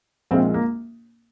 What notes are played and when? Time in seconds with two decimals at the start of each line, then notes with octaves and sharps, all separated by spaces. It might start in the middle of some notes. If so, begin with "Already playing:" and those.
0.31 A#1 A#2 G#3 C4 F4
0.54 A#3